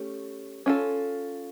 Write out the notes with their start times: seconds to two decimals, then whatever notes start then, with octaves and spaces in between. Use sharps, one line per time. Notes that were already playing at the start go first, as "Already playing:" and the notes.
Already playing: A3 C#4 G4
0.66 C#4 F4 A4